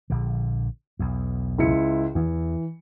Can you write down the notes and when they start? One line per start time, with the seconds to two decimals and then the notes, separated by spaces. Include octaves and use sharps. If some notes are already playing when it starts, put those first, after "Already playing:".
0.10 A#1 D3
0.99 B1 E2
1.58 C#2 E4 C#7
2.15 E2 E3